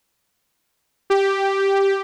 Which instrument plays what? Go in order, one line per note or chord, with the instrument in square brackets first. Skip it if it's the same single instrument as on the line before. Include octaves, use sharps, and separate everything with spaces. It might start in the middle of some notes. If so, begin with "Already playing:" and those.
[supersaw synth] G4